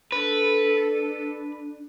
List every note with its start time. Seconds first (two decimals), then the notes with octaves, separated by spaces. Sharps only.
0.12 D4 A4 B4